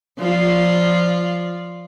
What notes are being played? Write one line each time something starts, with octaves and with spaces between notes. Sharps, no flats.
F3 F4 D5